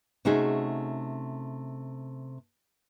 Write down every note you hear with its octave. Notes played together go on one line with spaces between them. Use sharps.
C3 A3 C#4 D#4 F#4 G#4